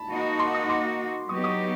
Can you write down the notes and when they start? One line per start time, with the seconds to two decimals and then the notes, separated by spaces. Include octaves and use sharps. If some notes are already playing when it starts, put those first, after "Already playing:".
Already playing: A5 B5
0.10 A#3 D#4 F#4
0.39 C6 D6
0.54 C#6 D#6
0.69 C6 D6
1.29 F#3 B3 D#4 G4 C#6 D#6
1.44 C#6 D#6